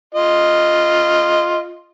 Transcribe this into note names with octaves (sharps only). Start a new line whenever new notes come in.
F4 D#5